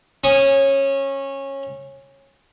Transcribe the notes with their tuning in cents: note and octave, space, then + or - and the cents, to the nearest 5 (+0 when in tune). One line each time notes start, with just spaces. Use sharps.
C#4 -20 D#6 +0